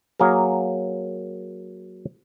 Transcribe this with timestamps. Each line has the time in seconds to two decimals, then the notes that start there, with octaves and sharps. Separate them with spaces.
0.20 F#3 A#3 G#4 A#4